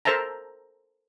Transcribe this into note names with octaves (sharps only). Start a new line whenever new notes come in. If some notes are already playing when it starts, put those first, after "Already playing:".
A4 A#4 C5 E5 A5 A#5